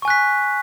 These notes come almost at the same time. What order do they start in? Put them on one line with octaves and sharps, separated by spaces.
C#6 G#5 F#6 B6